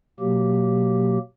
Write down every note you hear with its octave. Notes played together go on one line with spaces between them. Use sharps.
B2 F#3 A#3 G4